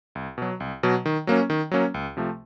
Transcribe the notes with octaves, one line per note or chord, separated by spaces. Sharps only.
C2
B2 F#3
C2
B2 F#3
D#3
F#3 A#3 C#4
D#3
F#3 A#3 C#4
C#2
C3 F3 A3